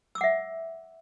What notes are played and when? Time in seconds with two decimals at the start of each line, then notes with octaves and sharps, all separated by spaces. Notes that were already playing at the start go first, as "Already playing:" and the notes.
0.15 E6
0.18 D6
0.21 F#5
0.24 E5